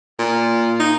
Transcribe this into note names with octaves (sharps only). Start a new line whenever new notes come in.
A#2
D#4